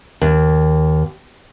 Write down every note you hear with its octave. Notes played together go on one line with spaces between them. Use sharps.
D#2